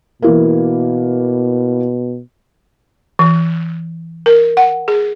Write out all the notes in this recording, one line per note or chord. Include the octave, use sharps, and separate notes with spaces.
B2 E3 A#3
E3
A#4
F#5
G#4